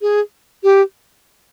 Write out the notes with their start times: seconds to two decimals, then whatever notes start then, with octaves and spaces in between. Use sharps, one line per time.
0.02 G#4
0.63 G4